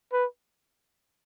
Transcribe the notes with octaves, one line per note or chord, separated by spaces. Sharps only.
B4